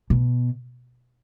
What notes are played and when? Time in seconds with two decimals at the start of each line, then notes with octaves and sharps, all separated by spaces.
0.10 B2